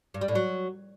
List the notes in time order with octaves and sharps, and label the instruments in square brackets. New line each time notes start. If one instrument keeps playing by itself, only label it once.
[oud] G2
G3
A2
F#3